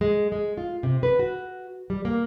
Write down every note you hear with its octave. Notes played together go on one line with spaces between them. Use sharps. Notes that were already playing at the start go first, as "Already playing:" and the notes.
G#3
G#3
F4
C3
B4
F#4
G3
A#3